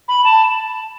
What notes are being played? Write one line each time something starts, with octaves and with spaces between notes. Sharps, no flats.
B5
A5